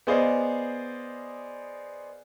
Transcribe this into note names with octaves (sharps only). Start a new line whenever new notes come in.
B3 G#4 C5 D5 D#5 F5